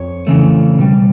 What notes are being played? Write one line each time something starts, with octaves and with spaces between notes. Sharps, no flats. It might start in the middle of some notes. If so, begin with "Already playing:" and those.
Already playing: F2 C#5
F2 C#3 E3 A3
B2 G3